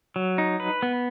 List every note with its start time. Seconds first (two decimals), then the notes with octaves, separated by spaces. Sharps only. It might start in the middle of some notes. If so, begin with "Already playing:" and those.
0.16 F#3
0.38 D#4
0.60 B4
0.83 B3